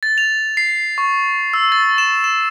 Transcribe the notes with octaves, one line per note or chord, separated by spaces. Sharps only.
A6
F7
C7
C#6
E6
A6
E7
E7